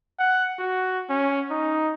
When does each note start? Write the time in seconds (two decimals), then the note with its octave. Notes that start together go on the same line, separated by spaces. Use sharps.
0.19 F#5
0.59 F#4
1.10 C#4
1.50 D#4